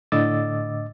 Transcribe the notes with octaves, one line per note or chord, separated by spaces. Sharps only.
A2 D3 D#5 D6 E6 A6